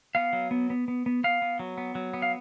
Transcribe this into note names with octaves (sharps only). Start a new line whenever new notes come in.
B3 F5
F#3
B3
B3
B3
B3
B3 F5
B3
F#3
B3
F#3
B3
F5